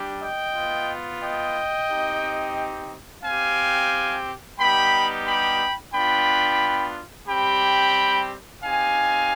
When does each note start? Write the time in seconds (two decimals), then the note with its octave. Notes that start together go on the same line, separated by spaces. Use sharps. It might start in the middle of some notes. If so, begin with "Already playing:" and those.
Already playing: G3 D4 G4
0.21 D#5 G5
0.55 B3 F4
1.22 D#5 G5
1.90 C4 D#4 G4
3.24 C4 G4 F5 G#5
4.59 G3 B3 D#4 G4 G5 B5
5.26 G5 B5
5.94 B3 D4 F4 G5 B5
7.28 G3 C4 G4 G5 B5
8.63 C4 D#4 G4 F5 G#5